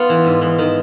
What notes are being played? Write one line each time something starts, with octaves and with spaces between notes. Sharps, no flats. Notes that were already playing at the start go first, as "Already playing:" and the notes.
Already playing: B3 F4
E3
G#2
E3
D#3